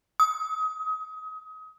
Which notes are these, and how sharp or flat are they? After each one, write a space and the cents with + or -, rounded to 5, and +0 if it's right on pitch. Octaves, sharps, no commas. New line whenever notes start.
D#6 +30